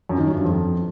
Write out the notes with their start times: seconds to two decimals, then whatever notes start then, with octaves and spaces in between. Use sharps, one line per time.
0.09 F#2
0.18 D#3
0.27 F#3
0.35 G2
0.44 F2